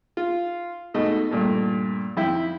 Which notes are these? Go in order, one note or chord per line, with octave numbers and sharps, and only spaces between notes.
F4
G#2 B2 A3 D#5
G2 A#2 A3
F2 E4 E5 G5